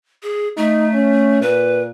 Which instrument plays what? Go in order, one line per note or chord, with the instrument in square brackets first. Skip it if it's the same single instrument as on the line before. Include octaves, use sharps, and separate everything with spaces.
[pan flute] G#4
[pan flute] A3 [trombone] D#4
[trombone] C#4
[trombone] A#2 [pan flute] B4